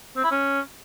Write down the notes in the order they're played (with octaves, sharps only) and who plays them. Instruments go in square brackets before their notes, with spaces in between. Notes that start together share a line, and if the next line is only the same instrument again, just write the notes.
[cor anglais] C4
E4
C#4